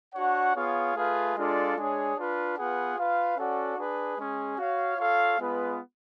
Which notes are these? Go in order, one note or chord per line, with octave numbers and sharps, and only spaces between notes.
D4 F#4 C#5 F#5
B3 F4 G#4 C#5 F5
A3 F4 G#4 B4 F5
G#3 D4 F4 A4 D5
G#3 D4 G#4 C#5
D4 F4 B4
B3 F4 G#4 B4 F#5
F4 B4 F5
C#4 F#4 A4 D5 F#5
D4 G#4 B4
G#3 C#4 G#4
F#4 C#5 F5
F4 A4 C#5 F5
G#3 B3 F4 B4